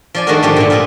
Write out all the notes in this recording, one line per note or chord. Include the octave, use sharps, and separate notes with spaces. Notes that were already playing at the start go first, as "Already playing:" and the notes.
F3 D5 G#5
D#3 G#3 A3 D4 F#4 A#4
G#2 D3 F3 G4 D5
A#2 D3 A3
A#2 F4 G#4 E5